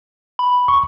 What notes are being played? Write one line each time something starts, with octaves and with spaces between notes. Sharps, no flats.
B5
C#6